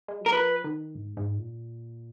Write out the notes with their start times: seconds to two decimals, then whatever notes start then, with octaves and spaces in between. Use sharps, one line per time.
0.08 G#3
0.21 F#3
0.26 A#4
0.32 F3 B4
0.64 D#3
0.95 G#2
1.17 G#2
1.38 A#2